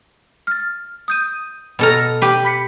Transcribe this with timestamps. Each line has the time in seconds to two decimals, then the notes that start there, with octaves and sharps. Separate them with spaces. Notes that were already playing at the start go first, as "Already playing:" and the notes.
0.47 F6 A6
1.08 D#6 G6 D#7
1.79 B2 A4 A#5 B5 E6 F6
2.22 G4 B4
2.45 B5 B6 C#7